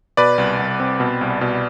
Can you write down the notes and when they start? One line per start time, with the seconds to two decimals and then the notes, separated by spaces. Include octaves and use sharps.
0.17 B2 B4 D5
0.38 C2
0.59 C2
0.80 C4
1.00 B2
1.21 C2
1.41 B2